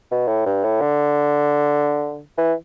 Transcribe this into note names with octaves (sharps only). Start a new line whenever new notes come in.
B2
A2
G2
A2
D3
E3